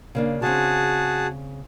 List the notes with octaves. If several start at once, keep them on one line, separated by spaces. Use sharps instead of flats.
C#3 A#3 D4
C#3 C4 F#4 G#4 A5